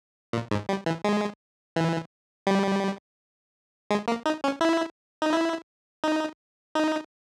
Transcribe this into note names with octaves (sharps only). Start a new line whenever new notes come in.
A#2
G#2
G3
E3
G#3
E3
G3
G#3
A#3
D#4
C#4
E4
D#4
E4
D#4
D#4